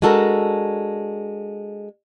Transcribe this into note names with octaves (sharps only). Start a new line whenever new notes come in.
G#3 D4 F#4 A4 A#4